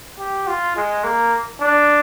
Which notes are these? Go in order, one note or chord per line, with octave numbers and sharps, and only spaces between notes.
G4
F4
G#3
A#3
D4